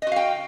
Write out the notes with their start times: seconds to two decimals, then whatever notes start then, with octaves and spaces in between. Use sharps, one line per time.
0.02 D#5
0.07 F#4
0.12 F5
0.16 G5